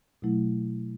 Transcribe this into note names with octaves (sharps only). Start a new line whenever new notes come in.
B2 F#3 A3 E4